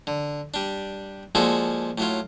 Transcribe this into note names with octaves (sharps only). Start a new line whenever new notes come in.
D3
G3 D4
A#2 F3 G#3 F#4 G#4 A4
A2 F#3 F4